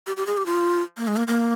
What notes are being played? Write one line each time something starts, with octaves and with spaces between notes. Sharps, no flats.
G4
G4
G#4
G4
F4
A#3
G#3
A#3
A#3